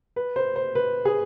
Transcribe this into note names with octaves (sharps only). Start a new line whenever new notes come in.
B4
C5
C5
B4
G#4